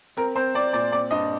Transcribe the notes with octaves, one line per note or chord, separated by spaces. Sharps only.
C4 A#4
C4 C5
C4 D5
A#2 D5
C4 D5
G2 D#5